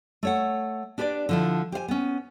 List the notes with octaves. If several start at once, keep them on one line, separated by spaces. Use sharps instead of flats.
A3 C#5 F#5
D4 G4 B4 C#5 D5
D3 F3 E4
G4 C5 F5 G#5
B3 C#4